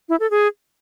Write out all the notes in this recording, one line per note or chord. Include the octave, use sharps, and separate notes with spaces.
E4
A4
G#4